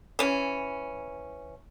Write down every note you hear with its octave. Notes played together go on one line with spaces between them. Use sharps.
E3 C#4